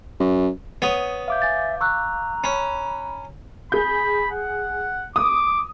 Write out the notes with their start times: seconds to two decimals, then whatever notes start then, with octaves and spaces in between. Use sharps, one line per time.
0.20 F#2
0.82 B3 C#5 D#6 D#7
1.28 E5 F5 D6 G6
1.42 G#5 A6
1.81 A#5 C#6 E6 F#6
2.44 C#4 B5
3.72 G#4 B5 G6
4.31 F#5
5.16 D6 D#6